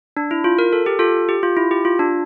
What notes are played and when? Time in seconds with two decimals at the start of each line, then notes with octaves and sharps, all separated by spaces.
0.17 D4
0.31 E4
0.44 F4
0.59 A#4
0.73 A4
0.86 G4
0.99 F4 A4
1.29 G4
1.43 F4
1.57 E4
1.71 G4
1.85 F4
1.99 D4